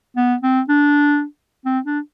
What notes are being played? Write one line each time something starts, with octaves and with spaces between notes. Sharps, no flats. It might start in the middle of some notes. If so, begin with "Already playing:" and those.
B3
C4
D4
C4
D4